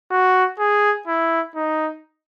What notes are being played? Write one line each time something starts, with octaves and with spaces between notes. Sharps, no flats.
F#4
G#4
E4
D#4